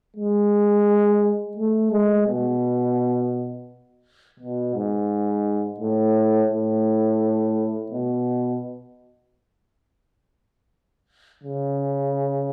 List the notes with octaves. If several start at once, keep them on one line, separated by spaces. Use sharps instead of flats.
G#3
A3
G#3
B2
B2
G#2
A2
A2
B2
C#3